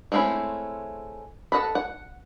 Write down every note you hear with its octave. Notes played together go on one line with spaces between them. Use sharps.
G#3 A3 C4 C#4 E4
A4 D#5 F#5 A5 B5
F#5